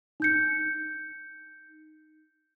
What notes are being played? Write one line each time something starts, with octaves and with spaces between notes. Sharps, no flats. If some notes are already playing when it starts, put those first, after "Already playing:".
D#4 G6 C#7